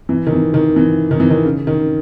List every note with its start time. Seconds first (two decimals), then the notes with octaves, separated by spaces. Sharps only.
0.09 E3
0.27 D#3
0.32 E3
0.54 D#3
0.76 E3
1.11 D#3
1.20 E3
1.30 D#3
1.45 C#3
1.67 D#3